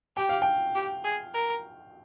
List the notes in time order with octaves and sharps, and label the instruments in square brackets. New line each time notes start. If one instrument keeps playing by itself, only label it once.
[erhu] G4 [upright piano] G5
[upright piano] F5
G5
[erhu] G4
G#4
A#4